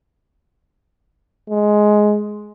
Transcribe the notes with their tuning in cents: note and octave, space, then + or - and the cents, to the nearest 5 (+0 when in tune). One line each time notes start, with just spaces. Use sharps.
G#3 +10